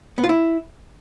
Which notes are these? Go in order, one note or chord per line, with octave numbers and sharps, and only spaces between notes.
B3
F4
E4